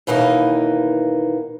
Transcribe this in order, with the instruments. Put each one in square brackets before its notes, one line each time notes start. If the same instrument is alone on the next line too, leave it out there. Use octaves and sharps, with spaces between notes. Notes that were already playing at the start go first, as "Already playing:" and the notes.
[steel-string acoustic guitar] D#2 B2 E3 A#3 C#4 D#4